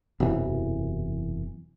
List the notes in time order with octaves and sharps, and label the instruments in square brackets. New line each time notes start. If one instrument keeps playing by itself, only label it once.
[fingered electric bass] E1 F#2 C3 E3